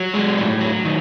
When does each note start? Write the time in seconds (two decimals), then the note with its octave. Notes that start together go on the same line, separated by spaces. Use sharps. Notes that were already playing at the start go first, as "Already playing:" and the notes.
Already playing: F#3
0.14 G#3
0.38 A2
0.61 F#3
0.85 D#3